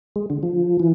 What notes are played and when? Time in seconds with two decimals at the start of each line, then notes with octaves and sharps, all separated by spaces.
0.16 G#3
0.30 D3
0.43 F3
0.80 E3